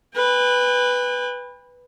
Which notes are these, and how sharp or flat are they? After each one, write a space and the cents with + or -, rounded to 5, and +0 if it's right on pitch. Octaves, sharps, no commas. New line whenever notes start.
B4 +0 G5 +45